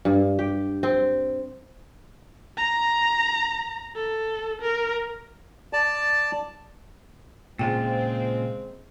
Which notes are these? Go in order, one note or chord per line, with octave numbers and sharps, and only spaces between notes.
G2
G4
C4
A#5
A4
A#4
D5 A5
A#2 C#3 G#3 C4 F4 G#4 G5